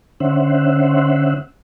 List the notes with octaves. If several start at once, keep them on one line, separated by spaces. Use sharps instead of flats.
D3 C#4 C5 E5 F#5